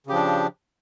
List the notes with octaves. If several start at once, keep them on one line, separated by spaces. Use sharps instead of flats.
C#3 F3 D4 G4